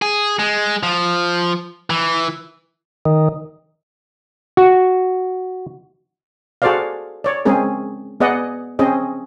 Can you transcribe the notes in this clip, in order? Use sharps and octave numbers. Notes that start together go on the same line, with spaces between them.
G#4
G#3
F3
E3
D#3
F#4
F#4 G#4 A4 C5 D5 F5
C#5 D5
G#3 C4 C#4 G#4 A#4
B3 G#4 D5 D#5 F#5
C4 C#4 G#4 D#5